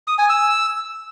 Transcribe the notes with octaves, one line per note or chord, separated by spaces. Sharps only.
D#6
G#5
E6